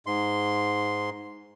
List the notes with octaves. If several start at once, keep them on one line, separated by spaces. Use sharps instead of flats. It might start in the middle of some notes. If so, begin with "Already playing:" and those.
G#2 C6